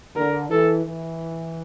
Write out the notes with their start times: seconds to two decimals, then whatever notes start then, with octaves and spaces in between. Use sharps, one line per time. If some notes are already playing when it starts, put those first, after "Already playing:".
0.15 D3 A#4
0.50 E3 A4
0.85 E3